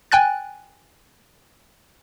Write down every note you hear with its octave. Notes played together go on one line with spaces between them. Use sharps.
G5 G#5 F#6 A6